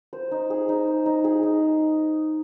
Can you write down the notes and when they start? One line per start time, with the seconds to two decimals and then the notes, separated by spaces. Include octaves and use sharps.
0.13 C5
0.32 D#4
0.50 G#4
0.69 D#4
0.87 C5
1.06 D#4
1.24 G#4
1.43 D#4